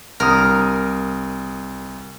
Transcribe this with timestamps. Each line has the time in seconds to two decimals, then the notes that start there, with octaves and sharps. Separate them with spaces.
0.20 C2 A#4 D#6